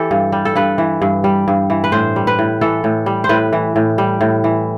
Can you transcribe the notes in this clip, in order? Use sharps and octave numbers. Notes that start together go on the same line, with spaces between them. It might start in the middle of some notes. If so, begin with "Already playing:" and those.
Already playing: E3 G4 A4
G2
G3
A4
G2 B4
E3
G2
G3
G2
E3
B4
A2 C5
G3
B4
A2
E3 A4
A2
G3
C5
A2 B4
E3
A2
G3
A2
E3